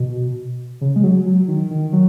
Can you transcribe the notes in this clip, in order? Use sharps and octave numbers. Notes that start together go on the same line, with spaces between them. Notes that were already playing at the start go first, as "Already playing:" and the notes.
Already playing: B2
C#3
G#3
F#3
F#3
D#3
D#3
F#3